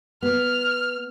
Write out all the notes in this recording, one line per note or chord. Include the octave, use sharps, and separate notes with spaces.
B3 F6